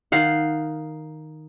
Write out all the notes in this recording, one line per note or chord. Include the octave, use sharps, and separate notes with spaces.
D#3 F5 F#5